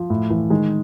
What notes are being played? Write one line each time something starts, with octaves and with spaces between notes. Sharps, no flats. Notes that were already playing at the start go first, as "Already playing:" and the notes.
Already playing: F3
A2
E3
D#3 G#3 G#4